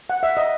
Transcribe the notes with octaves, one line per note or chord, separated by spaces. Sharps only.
F#5
E5
D#5